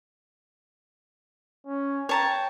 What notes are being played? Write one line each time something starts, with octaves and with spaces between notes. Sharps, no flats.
C#4
C#5 G5 A5 A#5